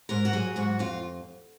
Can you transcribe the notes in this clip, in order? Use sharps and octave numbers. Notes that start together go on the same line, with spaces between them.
G#2 A#4
F#4
F#3 G#4
G#2 F#4
F2 F4